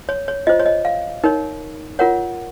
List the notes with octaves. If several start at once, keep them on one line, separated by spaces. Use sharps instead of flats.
C#5
C#5
F4 C5 D#5
C#5
D#5
F5
D#4 A#4 C#5
F4 A#4 C#5 F#5